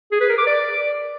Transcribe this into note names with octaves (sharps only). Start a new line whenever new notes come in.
G#4
B4
A#4
D6
D5